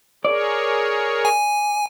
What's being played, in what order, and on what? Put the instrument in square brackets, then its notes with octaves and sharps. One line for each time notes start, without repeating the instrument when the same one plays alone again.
[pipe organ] G#4 A#4 C#5 [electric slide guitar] D5
[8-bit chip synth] G#5